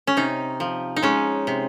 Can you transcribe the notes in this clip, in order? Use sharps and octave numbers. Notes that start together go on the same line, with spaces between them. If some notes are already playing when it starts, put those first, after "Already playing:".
C#4
C3 D#4
F3
D#4
G#3 C#4
C3